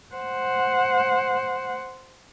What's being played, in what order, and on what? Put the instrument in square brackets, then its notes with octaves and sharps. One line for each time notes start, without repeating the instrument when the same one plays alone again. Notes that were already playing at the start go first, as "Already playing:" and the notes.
[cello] C5 F#5